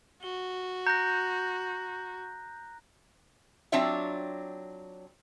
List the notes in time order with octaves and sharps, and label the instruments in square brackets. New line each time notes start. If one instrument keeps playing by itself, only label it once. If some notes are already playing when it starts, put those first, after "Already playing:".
[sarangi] F#4 [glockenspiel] G7
[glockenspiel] A#5 F#6 A#6 [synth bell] G6
[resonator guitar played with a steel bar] F#3 C4 D4 F4 C#5 E5